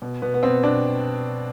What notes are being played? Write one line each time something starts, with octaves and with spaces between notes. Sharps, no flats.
B2
B2 B3
B3
B2 C4
B2 D4